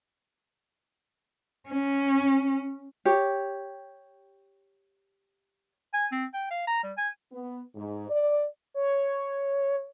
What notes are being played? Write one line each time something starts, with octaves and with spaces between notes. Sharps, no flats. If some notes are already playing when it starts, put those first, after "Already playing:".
C#4
G4 C#5
G#5
C4
G5
F5
A#5
G3
G#5
B3
G#2
D5
C#5